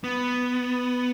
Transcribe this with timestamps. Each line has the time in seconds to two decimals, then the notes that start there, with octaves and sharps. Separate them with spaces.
0.04 B3